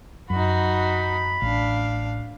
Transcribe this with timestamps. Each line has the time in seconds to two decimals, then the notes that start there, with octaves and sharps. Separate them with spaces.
0.30 F#2 D#4 F#4 B5
1.42 A1 D4 F5